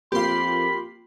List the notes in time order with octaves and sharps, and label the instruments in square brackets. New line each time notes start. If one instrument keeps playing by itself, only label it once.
[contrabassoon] F2 [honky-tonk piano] A#3 F4 [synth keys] G4 C6 [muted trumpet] B5